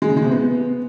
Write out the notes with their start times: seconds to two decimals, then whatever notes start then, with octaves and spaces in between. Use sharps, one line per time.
0.02 G#3
0.09 C#3
0.17 G#3
0.24 C3
0.32 B3